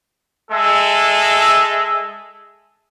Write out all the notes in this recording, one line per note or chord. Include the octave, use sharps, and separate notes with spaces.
G#3 A4 E5